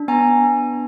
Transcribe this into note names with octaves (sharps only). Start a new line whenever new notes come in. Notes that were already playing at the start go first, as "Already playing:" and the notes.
Already playing: D4
B3 G#5 A#5
B3